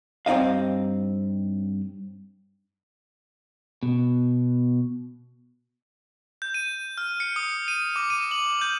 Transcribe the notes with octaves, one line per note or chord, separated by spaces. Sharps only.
G2 C4 D#4 D#5 F5
B2
G6
D#7
F6
C#7
D#6
D#7
D6
D#7
F#7
G6